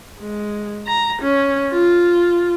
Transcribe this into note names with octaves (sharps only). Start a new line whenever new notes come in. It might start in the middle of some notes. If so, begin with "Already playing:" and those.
G#3
A#5
C#4
F4